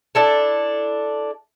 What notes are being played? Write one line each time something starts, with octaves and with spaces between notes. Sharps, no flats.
D4 E4 A4